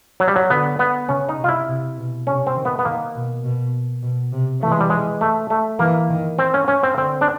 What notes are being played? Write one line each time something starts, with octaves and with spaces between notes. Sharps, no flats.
F#3
G3
F#3
D3 B3
B3
C#3 C#4
D#4
C3
F4
E4
C3
B2
C3 C#4
C4
D#3
B3
B3
D#3 A#3
B2
B2
B2
C3
E3 A3
G#3
G3
G#3
A3
A3
E3 A#3
D#3
C4
C#4
C#4
C4
D3 C4
D4